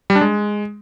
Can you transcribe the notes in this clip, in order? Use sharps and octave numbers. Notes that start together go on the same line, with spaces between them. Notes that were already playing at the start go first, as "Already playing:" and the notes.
G3
D4
G#3